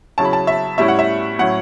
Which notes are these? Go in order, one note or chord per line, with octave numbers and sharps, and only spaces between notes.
C#3 F#3 C#4 E4 A5
B5
A5
E5
A2 G3 C#4 E4 E5
F#5
E5
A2 F#3 C#4 E4 F#5